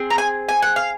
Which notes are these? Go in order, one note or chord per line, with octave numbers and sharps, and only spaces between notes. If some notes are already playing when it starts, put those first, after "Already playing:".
Already playing: C4 G#4
A#5
G#5
G#5
F#5
F5